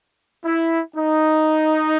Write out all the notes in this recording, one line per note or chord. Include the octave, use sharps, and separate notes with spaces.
E4
D#4